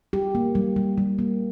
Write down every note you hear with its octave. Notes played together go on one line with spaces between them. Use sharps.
G3 G4
A#3
G3
G3
G3
A#3